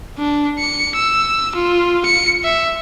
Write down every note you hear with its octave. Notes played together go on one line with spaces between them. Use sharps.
D4
C#7
E6
F4
C#7
E5